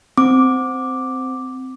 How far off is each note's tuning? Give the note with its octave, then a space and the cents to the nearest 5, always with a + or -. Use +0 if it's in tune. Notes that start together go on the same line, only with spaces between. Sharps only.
C4 -10 D6 +0